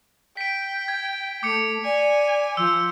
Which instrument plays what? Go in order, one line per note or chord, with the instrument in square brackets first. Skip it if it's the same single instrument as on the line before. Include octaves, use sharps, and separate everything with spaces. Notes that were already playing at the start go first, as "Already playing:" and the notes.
[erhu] G5 [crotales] B6 D7
[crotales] G#6
[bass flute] A3 [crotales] D6 C#7
[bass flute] D5 [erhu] G#5
[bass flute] F3 [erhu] C5 [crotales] E6